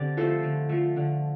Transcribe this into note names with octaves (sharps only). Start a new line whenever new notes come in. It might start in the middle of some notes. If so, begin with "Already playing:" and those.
Already playing: D3 C4 G4 D5
F3 A3 A4 C5
D3
F3 A3
D3